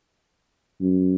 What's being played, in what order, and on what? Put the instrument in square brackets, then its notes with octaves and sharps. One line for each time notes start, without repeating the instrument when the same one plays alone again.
[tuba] F#2